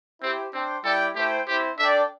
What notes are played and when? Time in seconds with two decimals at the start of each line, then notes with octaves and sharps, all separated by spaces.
0.22 C4 E4 G4 C5 G5
0.53 C4 D4 C5 G5
0.84 G3 E4 G4 A4 D5 G5
1.15 A3 E4 G4 C5 G5
1.48 C4 E4 G4 C5
1.78 D4 A4 D5 E5 G5